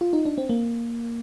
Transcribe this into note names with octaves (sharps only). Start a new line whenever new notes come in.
F4
D#4
D4
C4
A#3